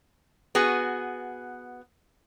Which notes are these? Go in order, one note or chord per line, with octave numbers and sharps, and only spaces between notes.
B3 F#4 G#4